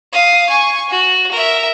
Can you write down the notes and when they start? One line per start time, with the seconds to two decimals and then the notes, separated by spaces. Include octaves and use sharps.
0.13 F5 D#6
0.49 G#5 C#6
0.89 F#4
1.32 A#4 E5